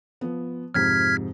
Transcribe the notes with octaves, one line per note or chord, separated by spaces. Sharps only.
F3 B3
F2 G#2 C3 F6 G#6 B6